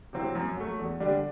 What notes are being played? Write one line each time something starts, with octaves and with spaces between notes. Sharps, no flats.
C3 F#3 C4 E4
F#2
F#3 A3
E2
D3 G3 D4